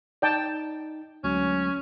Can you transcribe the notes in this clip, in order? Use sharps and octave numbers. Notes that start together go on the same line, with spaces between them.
D#4 D5 G5 A5
D2 F#3 G#3 C#4